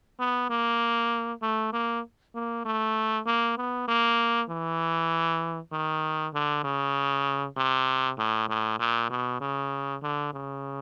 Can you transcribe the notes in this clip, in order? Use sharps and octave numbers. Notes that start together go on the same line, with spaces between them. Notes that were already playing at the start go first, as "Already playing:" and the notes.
B3
A#3
A3
A#3
A#3
A3
A#3
B3
A#3
E3
D#3
D3
C#3
C3
A2
A2
A#2
B2
C#3
D3
C#3